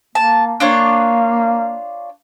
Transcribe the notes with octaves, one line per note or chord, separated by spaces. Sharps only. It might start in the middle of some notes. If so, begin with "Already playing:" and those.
A#3 A5
A#3 D4 F4 C#5